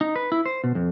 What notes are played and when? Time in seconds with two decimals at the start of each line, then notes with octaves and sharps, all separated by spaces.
0.01 D#4
0.16 B4
0.32 E4
0.46 C5
0.64 B2
0.75 F2